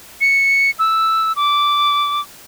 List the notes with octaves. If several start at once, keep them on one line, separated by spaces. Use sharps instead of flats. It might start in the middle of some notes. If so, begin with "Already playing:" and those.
C#7
E6
D6